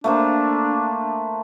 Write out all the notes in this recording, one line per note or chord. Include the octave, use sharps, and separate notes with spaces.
A3 A#3 D4 C5